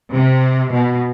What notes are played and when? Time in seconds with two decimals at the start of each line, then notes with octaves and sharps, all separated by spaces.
0.13 C3
0.73 B2